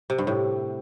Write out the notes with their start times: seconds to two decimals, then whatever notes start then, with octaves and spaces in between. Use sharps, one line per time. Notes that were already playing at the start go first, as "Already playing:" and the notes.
0.10 C3
0.18 G2
0.27 A2